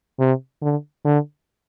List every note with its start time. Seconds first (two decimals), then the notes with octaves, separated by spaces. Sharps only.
0.19 C3
0.62 D3
1.05 D3